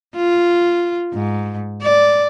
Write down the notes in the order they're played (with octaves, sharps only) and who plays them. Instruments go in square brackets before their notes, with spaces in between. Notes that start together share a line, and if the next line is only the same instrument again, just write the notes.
[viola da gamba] F4
G#2
D5